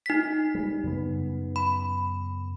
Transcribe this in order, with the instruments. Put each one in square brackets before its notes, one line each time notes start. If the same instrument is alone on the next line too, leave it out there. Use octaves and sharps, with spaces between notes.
[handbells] D#4 B6
[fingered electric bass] G3
F#2 C#3 B3
[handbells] B5